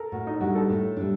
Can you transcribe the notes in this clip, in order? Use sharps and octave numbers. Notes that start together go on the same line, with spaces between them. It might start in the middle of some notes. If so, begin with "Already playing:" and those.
Already playing: A4 A#4
A2 F#4
D#4
G3 D4 F#4
A4
A2
G3 D4